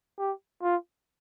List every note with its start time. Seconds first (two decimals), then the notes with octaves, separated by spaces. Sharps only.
0.19 G4
0.63 F4